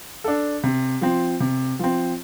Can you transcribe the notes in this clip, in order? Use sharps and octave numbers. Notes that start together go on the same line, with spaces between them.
D4 A4
C3
F3 C4
C3
F3 C4